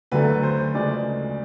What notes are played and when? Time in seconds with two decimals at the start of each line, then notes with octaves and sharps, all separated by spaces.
0.12 D2 D3 F#3 A3 B4
0.43 C5
0.75 D2 C#3 F3 G#3 D5